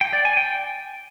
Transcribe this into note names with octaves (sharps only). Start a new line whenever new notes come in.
G5
D5
G#5
G5